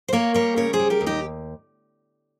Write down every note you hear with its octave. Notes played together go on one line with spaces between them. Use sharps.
C5
A#3 A#4 C#5
G3 A#4 C#5
C#3 A#4 C#5
G#4 C5
G3
G4 A#4
D#2
D#4 G4